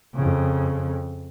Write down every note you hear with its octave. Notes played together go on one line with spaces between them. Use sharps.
F2 C#3